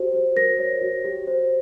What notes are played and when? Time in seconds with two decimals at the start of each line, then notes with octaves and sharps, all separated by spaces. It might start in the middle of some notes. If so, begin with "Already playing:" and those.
Already playing: F#4 G4 C5
0.13 C5
0.36 A#4 A#6
0.59 C#5
0.81 F#4
1.04 G4
1.27 C5